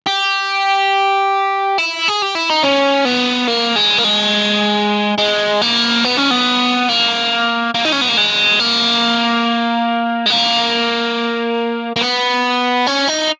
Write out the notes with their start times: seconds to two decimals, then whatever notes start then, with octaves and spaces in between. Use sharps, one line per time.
0.07 G4
1.78 E4
2.08 G#4
2.22 G4
2.35 E4
2.50 D#4
2.63 C#4
3.05 B3
3.48 A#3
3.76 G#3
3.99 A#3
4.05 G#3
5.18 G#3
5.62 A#3
6.05 B3
6.17 C#4
6.31 B3
6.89 A#3
7.75 A#3
7.85 D#4
7.92 C#4
8.01 B3
8.09 A#3
8.17 G#3
8.59 A#3
10.26 G#3
10.30 A#3
11.96 A#3
12.01 B3
12.87 C#4
13.08 D#4